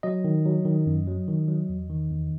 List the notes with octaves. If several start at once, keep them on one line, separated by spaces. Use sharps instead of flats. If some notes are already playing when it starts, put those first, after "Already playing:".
F#3 D#5
D#3
F#3
D#3
F#2
F#3
D#3
F#3
E2
D#3
E2